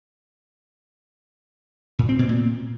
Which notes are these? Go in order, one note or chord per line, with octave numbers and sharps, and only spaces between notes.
A#2
C4
B2
A#2